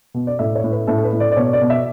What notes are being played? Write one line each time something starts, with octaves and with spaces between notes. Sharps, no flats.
B2
D5
A2 E5
C#5
A2
B4
A2 A4
A4
B4
A2
D5
D5
B2 C#5
D5
B2
E5